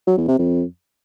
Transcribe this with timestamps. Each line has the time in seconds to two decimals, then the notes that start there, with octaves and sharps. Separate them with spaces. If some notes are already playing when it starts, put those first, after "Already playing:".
0.07 F#3
0.18 E2
0.28 C3
0.38 F2